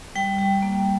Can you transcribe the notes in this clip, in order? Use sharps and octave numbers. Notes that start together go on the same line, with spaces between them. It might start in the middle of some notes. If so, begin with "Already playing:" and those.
G3 G5
G3
A#3